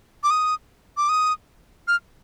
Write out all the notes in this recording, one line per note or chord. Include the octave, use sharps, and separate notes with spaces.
D6
D#6
D6
D#6
F6